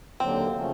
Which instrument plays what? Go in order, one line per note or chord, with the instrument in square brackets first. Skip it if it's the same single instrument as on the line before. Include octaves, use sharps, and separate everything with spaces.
[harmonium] D#2 D3 F#3 A#3 [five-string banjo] C4
[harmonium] C#3 F3 A3 C#4